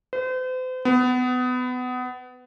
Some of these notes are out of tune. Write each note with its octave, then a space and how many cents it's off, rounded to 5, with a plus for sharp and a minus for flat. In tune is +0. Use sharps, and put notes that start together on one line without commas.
C5 -40
B3 +25